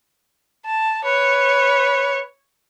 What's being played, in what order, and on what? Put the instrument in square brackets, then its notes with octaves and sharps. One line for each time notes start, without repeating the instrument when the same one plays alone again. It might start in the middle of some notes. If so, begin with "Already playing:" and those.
[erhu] A5
[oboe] B4 [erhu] C#5